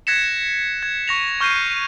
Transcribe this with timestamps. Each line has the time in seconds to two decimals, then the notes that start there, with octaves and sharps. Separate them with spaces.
0.07 F#6 G#6 A#6 B6 C#7 E7
0.83 G#6
1.08 C#6 A#6 F7
1.41 C#6 F6 G6 A#6 C7 D#7